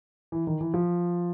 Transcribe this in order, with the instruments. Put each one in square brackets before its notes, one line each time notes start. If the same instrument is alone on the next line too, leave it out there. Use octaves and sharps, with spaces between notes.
[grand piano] E3
D#3
E3
F3